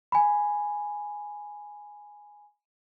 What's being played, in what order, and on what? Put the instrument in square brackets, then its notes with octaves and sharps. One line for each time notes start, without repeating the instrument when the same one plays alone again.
[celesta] G#5 B5